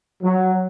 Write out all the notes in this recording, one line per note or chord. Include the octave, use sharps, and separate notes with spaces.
F#3